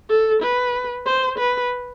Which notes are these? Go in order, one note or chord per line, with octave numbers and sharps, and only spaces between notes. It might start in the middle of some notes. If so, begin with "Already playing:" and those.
A4
B4
C5
B4